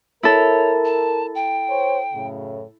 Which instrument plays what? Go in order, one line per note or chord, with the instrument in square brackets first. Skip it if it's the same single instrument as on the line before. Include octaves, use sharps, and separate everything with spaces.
[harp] E4 A4 [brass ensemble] A#4 [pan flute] C#5
[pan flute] A5
G5
[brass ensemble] C5 C#5
F#2 A2 C#3